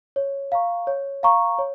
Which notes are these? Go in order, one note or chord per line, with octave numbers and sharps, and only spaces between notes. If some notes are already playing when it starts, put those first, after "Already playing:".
C#5
F5 A#5 C#6
C#5
F5 A#5 C#6
C#5